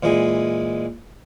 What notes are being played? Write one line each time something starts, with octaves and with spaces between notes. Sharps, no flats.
A#2 E3 G#3 G#4